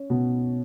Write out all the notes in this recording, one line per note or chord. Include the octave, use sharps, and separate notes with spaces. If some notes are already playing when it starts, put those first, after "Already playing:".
Already playing: C#4
B2